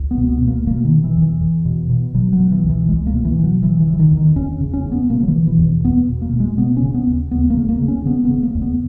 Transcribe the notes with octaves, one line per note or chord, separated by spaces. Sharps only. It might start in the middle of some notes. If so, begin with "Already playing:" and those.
Already playing: C#2
B3
B2
B3
B2
A#3
B2 A#3
D#3
B2
E3
E2
E3
E2
B2
B2
B2 F#3
F#3
B2
E3
C#2
E3
C#2 G#3
A#3
B2
E3
B2
F#3
C#3 E3
E3
C#3
E3
D#3
E2
D#3
E2 C#4
C#3
C#4
C#3
B3
B2 A#3
F#3
E3
B2
E3
E2
E3
E2 B3
B2
A#3
B2
G#3
C#3 B3
C#4
C#3
B3
D#2
D#2 B3
A#3
C#3
A#3
C#3
C#4
C#3 B3
B3
C#3
A#3
E2
B3